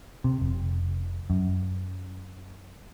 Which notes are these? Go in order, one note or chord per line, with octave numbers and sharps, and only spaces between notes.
C3
F1
F#2